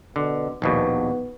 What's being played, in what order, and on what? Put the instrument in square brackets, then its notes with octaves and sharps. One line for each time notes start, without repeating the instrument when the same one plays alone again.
[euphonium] B2 [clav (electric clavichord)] D3
[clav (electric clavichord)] A#1 D#2 B2 [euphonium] B3